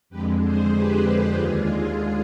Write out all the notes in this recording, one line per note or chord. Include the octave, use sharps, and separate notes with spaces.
F2 D3 G#3 G4 B4
G#4 C5
G4 B4
D#2 D3 G#3 F4 G#4